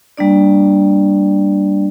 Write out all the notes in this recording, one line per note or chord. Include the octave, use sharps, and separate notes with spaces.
G3 A#3 D4 D5